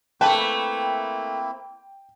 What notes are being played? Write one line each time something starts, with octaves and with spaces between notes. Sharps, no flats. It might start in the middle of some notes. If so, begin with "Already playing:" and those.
A3 A#3 C4 E4 B4 G5 A5